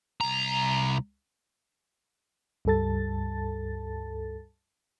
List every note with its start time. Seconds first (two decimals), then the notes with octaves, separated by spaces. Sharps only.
0.21 C2 A#5
2.65 C#2 G2 G3 A4 A5 A6